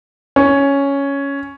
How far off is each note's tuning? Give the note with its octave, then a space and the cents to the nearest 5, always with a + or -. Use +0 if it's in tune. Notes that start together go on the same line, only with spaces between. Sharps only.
C#4 +5